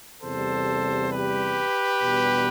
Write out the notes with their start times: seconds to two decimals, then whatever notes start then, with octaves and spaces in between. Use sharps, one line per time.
0.22 E2 C3 G3 A4 C5
1.11 G4 B4
2.00 E2 B2 G3 B3 D4